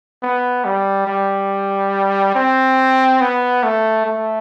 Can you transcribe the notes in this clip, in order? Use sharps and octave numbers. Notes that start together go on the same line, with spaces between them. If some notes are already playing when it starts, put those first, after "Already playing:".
B3
G3
G3
C4
B3
A3
A3